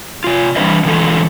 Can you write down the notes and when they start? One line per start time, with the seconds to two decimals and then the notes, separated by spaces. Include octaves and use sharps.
0.24 C3 F4
0.56 E3 G3 D4 B4 C5 D#5
0.84 B2 D3 E3 G#3 F4 A4